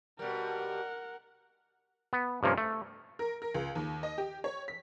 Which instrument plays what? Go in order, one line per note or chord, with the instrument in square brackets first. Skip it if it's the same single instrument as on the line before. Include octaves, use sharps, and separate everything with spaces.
[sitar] B2 G3 [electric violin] A#4 F#5
[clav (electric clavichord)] B3
G2 C3 F3 A#3 C#4
A3
[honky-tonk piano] A#4
A#4
C#2
D#2
D#5
G4
C#5
B6